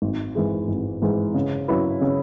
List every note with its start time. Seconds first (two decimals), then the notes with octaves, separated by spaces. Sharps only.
0.02 G#1
0.35 G#2 E3 G#3
0.68 G#1
1.02 G#2 E3 G#3
1.34 C#3
1.68 F#3 C#4 E4 B4
2.01 C#3